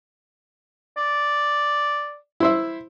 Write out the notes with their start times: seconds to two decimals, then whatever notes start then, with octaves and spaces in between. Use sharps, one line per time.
0.97 D5
2.40 E4 C5 E5